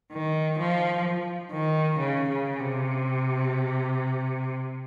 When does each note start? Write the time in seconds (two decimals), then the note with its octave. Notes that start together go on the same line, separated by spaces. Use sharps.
0.12 D#3
0.59 F3
1.52 D#3
1.99 C#3
2.29 C#3
2.60 C3